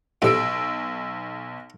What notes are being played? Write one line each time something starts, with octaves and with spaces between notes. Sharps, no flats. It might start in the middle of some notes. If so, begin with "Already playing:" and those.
B1 F2 A2 C3 E6 D7